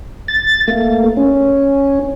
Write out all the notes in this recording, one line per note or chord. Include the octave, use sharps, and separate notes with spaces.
A6
A3 A#3
C#4